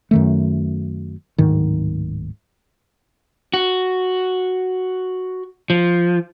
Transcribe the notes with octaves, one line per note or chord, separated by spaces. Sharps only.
F#2 D#3 A3
D1 G#2 D#3
F#4
F3